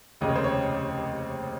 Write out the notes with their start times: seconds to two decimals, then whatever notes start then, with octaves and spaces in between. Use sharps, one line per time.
0.21 F1 D#2 C#3 D#5
0.29 C#5
0.36 C5
0.44 C#5